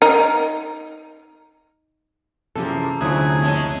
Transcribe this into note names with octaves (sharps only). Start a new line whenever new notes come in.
D#4 A#4
E2 C3 F3 A#3 C#4 G4 A4
D2 G#2 F3 F#3 E4 G#4 A4
G#3 C4 C#4 A5